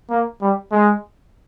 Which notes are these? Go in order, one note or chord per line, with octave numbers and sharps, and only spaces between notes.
A#3
G3
G#3